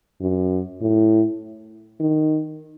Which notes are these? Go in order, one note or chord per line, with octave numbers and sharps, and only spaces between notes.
F#2
A2
D#3